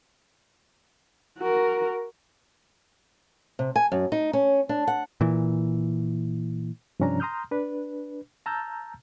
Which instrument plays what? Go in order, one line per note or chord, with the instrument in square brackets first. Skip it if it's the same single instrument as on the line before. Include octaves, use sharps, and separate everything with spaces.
[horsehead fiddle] F#4 A#4
[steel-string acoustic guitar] C3
G#5
F#2
D#4
C#4
D4
F#5
[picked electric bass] A#2 E3
[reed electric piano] G2 C3 F3 C#4 D4 A#5
A#5 C6 D#6 F6 G6
D4 B4
A5 A#5 E6 F6 G6 A6